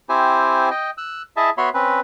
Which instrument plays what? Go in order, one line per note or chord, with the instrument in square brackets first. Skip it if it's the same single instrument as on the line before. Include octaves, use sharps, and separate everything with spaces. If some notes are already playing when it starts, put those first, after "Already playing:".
[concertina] C4 E4 G4 C5 G#5
D#5 G5
E6 F#6
E4 G#4 D#5 E5 A5
B3 F#4 C#5 E5 B5 C6
C4 C#4 B4